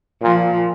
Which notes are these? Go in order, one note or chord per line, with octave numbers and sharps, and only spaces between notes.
A#2 F3